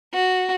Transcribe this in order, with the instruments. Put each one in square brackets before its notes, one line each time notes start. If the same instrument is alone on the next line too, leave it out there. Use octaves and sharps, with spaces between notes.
[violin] F#4